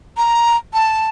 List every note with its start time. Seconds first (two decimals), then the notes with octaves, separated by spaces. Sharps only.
0.17 A#5
0.73 A5